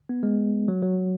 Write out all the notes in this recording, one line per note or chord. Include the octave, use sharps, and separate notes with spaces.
B3
G#3
F#3
F#3